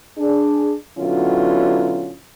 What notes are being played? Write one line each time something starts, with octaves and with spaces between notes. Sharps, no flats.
D4 G#4
B2 D3 F#3 C#4 E4 F4